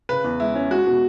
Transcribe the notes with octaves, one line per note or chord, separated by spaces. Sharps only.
C#3 B4
E2
G#3 E4
C#4
G#3 F#4
B2